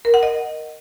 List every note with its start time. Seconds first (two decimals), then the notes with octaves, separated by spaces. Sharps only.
0.05 A#4
0.14 F#5
0.23 D#5